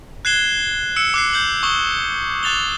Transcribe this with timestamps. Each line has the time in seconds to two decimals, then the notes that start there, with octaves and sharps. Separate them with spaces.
0.25 F#6 G#6 C7 E7 G7
0.96 E6 C#7 D7 E7
1.14 D6 F#6 C7
1.33 G6 F#7
1.63 C#6 D#6 E7 G7
2.43 D6 F#6 A6 F7 G7